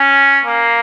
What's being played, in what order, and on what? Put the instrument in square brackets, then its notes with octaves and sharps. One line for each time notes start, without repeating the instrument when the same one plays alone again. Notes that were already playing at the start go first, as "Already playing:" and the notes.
Already playing: [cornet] C#4
A#3